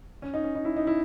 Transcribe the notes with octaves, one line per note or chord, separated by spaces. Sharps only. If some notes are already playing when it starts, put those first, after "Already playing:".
C#4
D#4
C#4
D#4
E4
D#4
E4